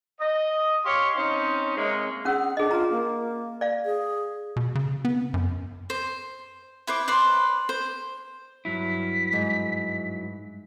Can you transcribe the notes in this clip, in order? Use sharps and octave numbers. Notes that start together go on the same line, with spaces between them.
D#5
G4 C#5 F5 C6
C4 C#4 D#4
C3 G#3 A#3 C#5
C#4 G#4 F#5 E6
D4 G#4 D#5
F4 G#4 A#5
A#3
D5 F5
G#4
B2
C#3
B3
F#2
C5
E4 B4 C5 D6
B4 C5 D5 C6
C5
G2 F#3 E4 B6
G#2